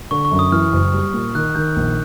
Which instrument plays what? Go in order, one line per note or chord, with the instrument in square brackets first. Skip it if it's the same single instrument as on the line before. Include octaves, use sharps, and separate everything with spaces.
[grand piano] D3 [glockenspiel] C#6
[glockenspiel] C#6
[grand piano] F#2
[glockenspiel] D#6
[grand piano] E3 [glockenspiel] F6
[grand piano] F#1
G3
A#2
[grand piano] D#3 [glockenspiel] F#6
[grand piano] D#3 [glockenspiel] G6
[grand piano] A#1